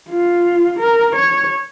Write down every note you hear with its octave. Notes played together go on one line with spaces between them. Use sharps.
F4
A#4
C#5